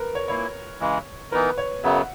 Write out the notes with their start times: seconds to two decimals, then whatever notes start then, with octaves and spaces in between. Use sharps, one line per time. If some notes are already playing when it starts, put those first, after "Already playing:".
Already playing: A#4 B4
0.15 C#5
0.28 A#2 A#3 E4 C#5
0.80 C#3 E3 G#3
1.32 E3 B3 D#4 A#4 B4
1.58 C#5
1.84 F#2 C#3 F#3 B3 E5
1.96 F#5